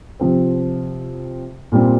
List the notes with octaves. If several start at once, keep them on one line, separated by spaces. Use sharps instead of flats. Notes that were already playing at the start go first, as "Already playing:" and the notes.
C3 F3 C4
A#2 G3 C4